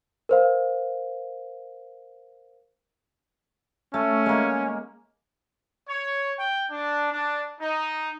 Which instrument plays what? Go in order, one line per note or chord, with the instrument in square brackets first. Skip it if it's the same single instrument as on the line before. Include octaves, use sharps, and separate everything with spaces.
[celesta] A#4 C5 F5
[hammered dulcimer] A3 [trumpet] C#4
[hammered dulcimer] G#3 A#3
[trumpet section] C#5
G5
D4
D4
D#4